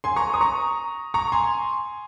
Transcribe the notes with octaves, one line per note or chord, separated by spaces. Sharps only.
G#5 C6
A#5 C#6
D#6
A#5 C#6
A#5 C#6
G#5 C6